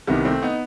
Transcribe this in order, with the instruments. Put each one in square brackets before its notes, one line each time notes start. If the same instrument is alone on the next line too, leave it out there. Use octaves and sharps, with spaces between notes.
[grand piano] C2 C3 D#3 [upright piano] G3 B3
[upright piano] A3 C4
B3 D#4